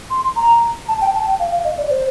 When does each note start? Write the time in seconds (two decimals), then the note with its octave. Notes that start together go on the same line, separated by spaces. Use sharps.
0.10 C6
0.36 A#5
0.88 A5
1.01 G5
1.14 A5
1.26 G5
1.39 F5
1.51 F5
1.64 D#5
1.78 D5
1.90 C5